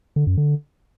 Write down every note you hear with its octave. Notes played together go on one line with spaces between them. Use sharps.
D3
F#2
D3